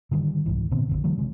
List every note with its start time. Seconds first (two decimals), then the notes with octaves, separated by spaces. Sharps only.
0.11 D3 D#3 G3
0.46 C2 G#2 E3
0.71 A#2 D3 B3 C4
0.89 A#1 F#2 D3
1.04 D3 E3 F#3 A3
1.18 C3 G#3